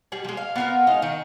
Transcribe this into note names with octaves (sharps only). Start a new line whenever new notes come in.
G3 G#4
F3 G#3
F5
B3 F4 A#4
G#3 D#4 F5
D#3